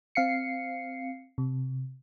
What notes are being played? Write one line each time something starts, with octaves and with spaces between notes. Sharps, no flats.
C4 F5 C7 C#7
C3